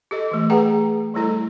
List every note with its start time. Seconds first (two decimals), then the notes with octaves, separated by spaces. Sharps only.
0.11 G4 A4 D#5
0.31 E3 A3
0.50 G#4 B4 F#5 G5 A#5
1.14 G3 A3 E4 A4